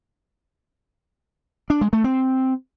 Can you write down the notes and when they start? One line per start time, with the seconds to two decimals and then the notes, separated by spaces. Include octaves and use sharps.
1.70 D4
1.81 G#3
1.93 A3
2.04 C4